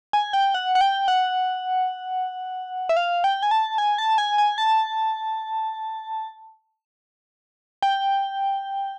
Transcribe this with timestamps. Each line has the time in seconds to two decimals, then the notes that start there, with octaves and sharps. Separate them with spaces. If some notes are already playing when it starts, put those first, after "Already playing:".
0.13 G#5
0.33 G5
0.54 F#5
0.75 F#5
0.81 G5
1.08 F#5
2.89 E5
2.97 F5
3.24 G5
3.43 G#5
3.51 A5
3.78 G#5
3.98 A5
4.18 G#5
4.38 G#5
4.58 A5
7.83 G5